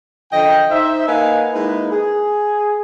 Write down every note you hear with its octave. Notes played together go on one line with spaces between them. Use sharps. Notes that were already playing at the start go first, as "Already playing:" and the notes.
D3 F3 D#5 G5
D#4 C5 E5
A#3 D#4 B4 F5 F#5 G#5
G#3 A#3 D#4 E4 B4
G#4